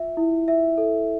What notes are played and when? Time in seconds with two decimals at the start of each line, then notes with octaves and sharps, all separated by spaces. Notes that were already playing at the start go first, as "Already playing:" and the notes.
Already playing: F4 E5
0.17 E4
0.48 E5
0.78 A4